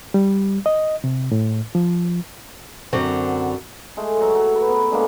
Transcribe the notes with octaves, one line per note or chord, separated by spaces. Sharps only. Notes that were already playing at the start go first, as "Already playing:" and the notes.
G3
D#5
C3
A2
F3
F#2 D3 C4
G#3 A3
F#3 F#4 C#5
F#3
B4
B3
D3 G#3 A#3